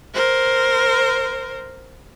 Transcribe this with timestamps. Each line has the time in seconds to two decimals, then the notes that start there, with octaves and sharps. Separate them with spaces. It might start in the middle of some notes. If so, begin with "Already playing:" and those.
0.14 A#4 C5